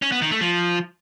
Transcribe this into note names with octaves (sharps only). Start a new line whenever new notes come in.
C#4
B3
D#3
A3
F3